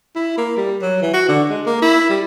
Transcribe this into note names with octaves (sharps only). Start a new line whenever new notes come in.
E4
A#3
G3
F#3
E3
F#4
D3
G#3
A#3
E4
G3